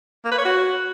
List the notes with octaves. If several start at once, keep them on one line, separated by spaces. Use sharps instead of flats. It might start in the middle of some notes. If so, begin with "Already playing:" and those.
A#3
B4
C#5
F#4